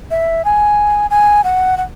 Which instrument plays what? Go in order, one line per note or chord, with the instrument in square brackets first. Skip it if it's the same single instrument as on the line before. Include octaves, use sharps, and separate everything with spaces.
[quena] E5
G#5
G#5
F#5
F#5